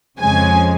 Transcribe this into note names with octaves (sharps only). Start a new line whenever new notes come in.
F2 C#3 F3 G#3 G#5